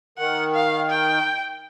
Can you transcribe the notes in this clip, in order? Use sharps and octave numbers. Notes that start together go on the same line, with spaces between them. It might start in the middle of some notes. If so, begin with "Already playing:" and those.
D#3 F#5
F5
G5